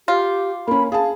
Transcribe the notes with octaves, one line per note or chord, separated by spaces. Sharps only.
F4 G4
A#3 C#4 B5
G#4 F5 A5